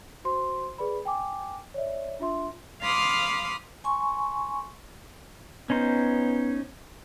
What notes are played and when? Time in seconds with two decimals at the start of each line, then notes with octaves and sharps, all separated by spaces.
0.24 F#4 C5 C6
0.78 G#4 B4 D5 B5
1.05 G5 G#5 D6
1.74 C#5 D5 E5
2.20 D4 F4 E5 C6
2.82 F5 B5 C6 D6 D#6 F6
3.84 G#5 C6 C#6
5.70 B3 C#4 D#4 C5